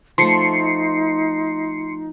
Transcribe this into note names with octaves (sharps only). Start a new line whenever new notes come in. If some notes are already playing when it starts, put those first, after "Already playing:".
F3 A3 D#4 C6 C7 C#7